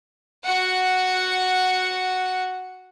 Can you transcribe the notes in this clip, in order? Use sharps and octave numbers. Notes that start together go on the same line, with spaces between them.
F#4 F#5